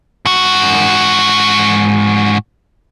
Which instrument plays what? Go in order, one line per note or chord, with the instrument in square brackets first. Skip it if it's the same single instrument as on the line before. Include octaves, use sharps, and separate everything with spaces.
[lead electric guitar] G#2 F#4